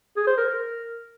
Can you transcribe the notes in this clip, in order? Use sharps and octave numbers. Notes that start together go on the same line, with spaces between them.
G#4
C5
A#4
A#4